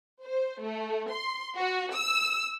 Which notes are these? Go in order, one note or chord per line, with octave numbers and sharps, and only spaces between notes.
C5
A3
C6
F#4
E6